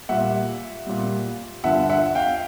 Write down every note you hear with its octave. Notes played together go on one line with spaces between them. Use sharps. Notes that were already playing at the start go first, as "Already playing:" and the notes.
A#2 G3 E5 F#5
A#2 G3
G2 D3 F3 E5 F#5
E5 F#5
F5 G5